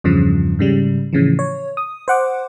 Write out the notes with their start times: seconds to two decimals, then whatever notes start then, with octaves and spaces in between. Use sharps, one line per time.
0.04 E2 G2 C#3 F3
0.59 G#2 C#3 G3
1.13 A2 C#3 E3 F3
1.39 C#5
1.77 D#6
2.08 C5 F#5 D6